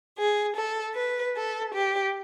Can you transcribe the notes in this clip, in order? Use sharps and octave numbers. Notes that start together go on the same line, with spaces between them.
G#4
A4
B4
A4
G4